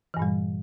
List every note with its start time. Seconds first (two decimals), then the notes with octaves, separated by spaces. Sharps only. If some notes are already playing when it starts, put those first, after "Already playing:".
0.14 E3
0.17 G2
0.19 A#2
0.22 G3